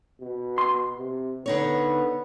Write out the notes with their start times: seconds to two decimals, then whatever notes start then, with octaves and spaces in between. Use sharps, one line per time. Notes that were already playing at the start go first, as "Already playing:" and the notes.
0.21 B2
0.58 C6
0.98 C3
1.46 D3 B3 D#4 C#5